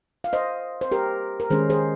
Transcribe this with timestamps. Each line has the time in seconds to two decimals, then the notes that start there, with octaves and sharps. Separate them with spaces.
0.24 F5
0.33 C5 D#5
0.81 C5
0.92 G4 A#4
1.40 A#4
1.50 D#3 G#3 C#4 G#4 C5
1.70 G#4 C5